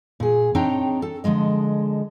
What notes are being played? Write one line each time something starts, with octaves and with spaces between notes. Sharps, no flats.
A#2 G#4
C4 D4 D#4 C#5 G5 A#5
A4
D3 F3 G#3 D#5